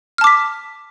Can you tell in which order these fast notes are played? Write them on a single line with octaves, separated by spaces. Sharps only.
F6 A5 D6 B6